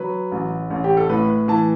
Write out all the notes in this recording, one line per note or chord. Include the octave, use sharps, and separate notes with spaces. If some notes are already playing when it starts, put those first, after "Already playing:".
Already playing: F#3 B4
A1
A1
G4
A4
A2 B4
B4
E3 A5